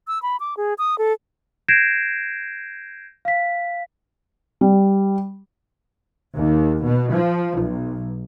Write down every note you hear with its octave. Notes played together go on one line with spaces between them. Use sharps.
E6
B5
D6
G#4
D#6
A4
G6 G#6 A#6 C7 D7 E7
F5 B6
G3
D#2
B2
F3
B1